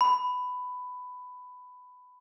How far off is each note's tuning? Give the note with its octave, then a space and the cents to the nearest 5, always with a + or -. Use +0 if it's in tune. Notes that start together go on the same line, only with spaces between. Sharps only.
B5 +15